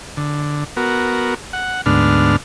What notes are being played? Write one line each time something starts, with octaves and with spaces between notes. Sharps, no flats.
D3
B3 F#4 A#4
F#5
D2 G#2 B3 D4 F6